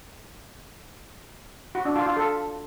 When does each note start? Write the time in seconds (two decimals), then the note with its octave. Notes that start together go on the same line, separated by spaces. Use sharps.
1.75 F#4
1.85 D4
1.96 F4
2.06 F4
2.16 A4